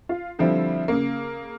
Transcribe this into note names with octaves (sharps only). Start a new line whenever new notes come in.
F4
D3 F3 G3 C4 E4
C#3 A#3